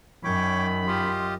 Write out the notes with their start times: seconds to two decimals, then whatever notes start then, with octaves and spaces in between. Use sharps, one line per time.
0.24 F#2 D#3 C#5 G5 B5 D6
0.87 F4 G4 D#5 C6